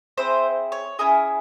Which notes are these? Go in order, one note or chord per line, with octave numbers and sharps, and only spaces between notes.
C4 E4 G#4 C5
C#5
C#4 E4 G#4 D#5